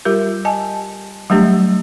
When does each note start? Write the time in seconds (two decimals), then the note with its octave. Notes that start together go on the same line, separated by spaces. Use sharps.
0.05 G3 F4 G4 A#4
0.45 D#5 G#5 A5
1.30 F#3 G3 A3 D4 G4